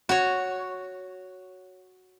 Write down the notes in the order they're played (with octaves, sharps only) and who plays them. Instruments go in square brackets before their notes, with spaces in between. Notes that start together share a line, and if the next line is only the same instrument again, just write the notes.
[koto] F#4 C#5